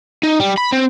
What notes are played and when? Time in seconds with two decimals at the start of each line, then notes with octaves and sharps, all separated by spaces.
0.23 D#4
0.40 G3
0.58 B5
0.73 C4